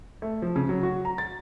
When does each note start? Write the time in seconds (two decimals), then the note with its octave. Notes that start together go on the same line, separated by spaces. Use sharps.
0.22 A3
0.42 F3
0.56 C#3
0.69 F#3
0.83 F#4
1.05 A#5
1.18 A6